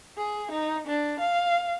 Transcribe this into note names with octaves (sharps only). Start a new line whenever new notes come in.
G#4
D#4
D4
F5